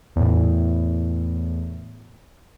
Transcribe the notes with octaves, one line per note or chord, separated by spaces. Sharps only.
E2 A2